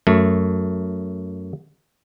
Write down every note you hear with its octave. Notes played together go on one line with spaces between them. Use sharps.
F#2 A3